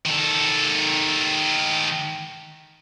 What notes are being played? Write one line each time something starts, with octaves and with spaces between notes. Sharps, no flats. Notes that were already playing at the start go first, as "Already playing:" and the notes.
D#3 A4